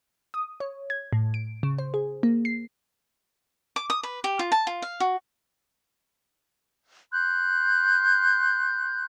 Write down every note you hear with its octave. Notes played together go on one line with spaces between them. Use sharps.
D#6
C#5
G#6
A2
D7
C#3
C5
G#4
A#3
C7
D6
D#6
B4
G4
F4
A5
F4
F5
F#4
C6 F#6 G6